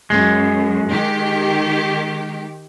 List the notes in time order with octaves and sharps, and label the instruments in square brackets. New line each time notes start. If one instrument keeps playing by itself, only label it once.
[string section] F#2 [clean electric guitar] G#3
[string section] D#3 G4